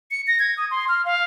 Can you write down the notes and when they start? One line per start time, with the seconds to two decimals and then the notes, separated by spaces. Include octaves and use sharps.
0.11 C#7
0.27 A#6
0.39 G#6
0.57 D#6
0.71 C6
0.89 F6
1.05 F5